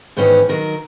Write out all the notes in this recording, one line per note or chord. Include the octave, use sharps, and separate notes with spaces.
G#2 D#3 E3 B3 C#4
D#3 F#3 A#4